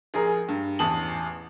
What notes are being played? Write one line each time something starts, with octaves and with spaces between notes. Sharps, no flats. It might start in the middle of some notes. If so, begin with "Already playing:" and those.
A#1 G#4 A#4
G2
A1 E2 A5 D#6 F#7